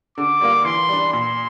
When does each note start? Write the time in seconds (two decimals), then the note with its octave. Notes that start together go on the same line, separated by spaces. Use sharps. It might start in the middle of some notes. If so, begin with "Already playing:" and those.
0.18 D3 D6
0.41 G3 A#3 F4
0.65 E3 C6
0.89 G3 D4
1.13 A#2 C6